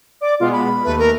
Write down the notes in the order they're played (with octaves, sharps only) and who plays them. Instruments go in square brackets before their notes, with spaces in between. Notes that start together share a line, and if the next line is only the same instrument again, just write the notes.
[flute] D5 [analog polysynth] D6
[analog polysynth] B2 G#3 B3 [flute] F4
[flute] B5
[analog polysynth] D#2 A3 [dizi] B4
[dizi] A#4